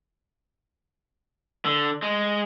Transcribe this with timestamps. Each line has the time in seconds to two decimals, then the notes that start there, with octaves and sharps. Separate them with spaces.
1.66 D3
2.03 G#3